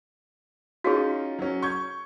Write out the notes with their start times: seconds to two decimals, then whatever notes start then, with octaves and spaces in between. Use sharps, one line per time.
0.84 C#4 D#4 F4 F#4 G#4
1.39 F#3 C#4
1.62 C#6 G6 G#6